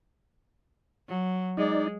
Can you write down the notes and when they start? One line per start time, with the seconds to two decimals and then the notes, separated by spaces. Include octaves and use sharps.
1.08 F#3
1.57 G#3 D#4 D5